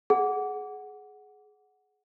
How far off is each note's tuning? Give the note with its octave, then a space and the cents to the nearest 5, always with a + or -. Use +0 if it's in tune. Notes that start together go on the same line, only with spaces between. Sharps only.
G#4 +20 F#5 +0